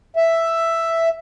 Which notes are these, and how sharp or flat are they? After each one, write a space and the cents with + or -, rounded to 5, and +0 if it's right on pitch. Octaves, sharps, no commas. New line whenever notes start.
E5 +5